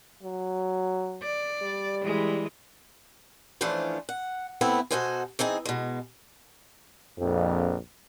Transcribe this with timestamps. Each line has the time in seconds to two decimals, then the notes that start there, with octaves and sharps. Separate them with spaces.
0.23 F#3
1.23 D5
1.62 G3
2.03 E3 G#3
3.61 E3 F3 A3 C#4 D4 C5
4.09 F#5
4.61 A2 A3 B3 C4 E4
4.91 B2 F#4 A4 C5 D#5 G#5
5.39 E3 C4 D#4 G#4
5.65 B2 G#3
7.18 A#1 F2